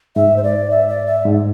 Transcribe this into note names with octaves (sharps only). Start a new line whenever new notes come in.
G#2 E5
C5
D5
E5
D5
E5
G#2